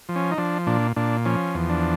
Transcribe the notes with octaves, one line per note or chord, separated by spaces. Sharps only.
F3
C#4
D#4
F3 D4
A#2 D4
A#2 D4
F3 C#4
E2
D4